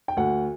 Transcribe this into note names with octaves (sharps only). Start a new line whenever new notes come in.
G5
D2 F#5